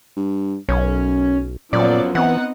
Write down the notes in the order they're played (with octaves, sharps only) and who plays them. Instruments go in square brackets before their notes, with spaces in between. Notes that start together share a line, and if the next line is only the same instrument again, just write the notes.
[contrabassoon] G2
[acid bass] B1 [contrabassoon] F#2 [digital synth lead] C#4
[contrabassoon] F#2 [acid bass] A#2 [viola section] F3 F#3 B3 [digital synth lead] D5
[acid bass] E3 [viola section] B3 C4 D#4 [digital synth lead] F#5